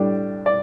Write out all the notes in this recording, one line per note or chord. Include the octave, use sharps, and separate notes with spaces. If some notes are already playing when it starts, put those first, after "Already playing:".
Already playing: A2 G3 D4
D5